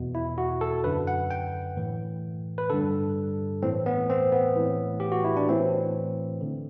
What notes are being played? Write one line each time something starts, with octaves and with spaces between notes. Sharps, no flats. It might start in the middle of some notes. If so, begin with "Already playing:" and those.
Already playing: E2 B2
E4
F#4
A4
F#2 D3 B4
F#5
G5
A2 E3
B4
G2 D3 A4
A2 E3 C4
B3
C4
B3
A2 E3
G4
F#4
E4
D4
A2 E3 C4
D3